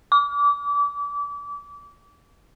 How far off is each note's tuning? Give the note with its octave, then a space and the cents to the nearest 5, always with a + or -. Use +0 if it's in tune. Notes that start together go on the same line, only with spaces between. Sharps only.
D6 -30